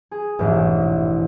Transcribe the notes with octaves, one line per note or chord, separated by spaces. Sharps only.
G#4
A1 F2 G#2 B2 E3 D4